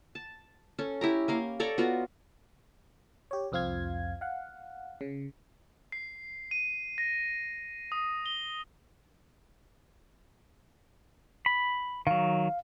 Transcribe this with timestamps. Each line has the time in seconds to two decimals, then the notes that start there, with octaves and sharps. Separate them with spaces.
0.15 A5
0.79 C#4 A4
1.01 E4 G4 A#5
1.28 A#3 A#4 F5
1.60 A4 C#5 D5 A#5
1.78 B3 F4 F#4 A#5
3.31 G4 C#5
3.52 C2 F2 C4 F4 F5 G#6
4.21 F5 F#5
5.01 C#3
5.92 C7
6.51 D#7
6.98 A#6
7.92 D#6
8.26 G7
11.46 B5
12.07 D#3 F#3 F5